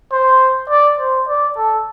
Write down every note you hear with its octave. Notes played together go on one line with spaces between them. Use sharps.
C5
D5
C5
D5
A4